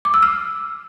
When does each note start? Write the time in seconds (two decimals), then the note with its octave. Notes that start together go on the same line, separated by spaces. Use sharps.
0.05 D6
0.14 E6
0.23 F6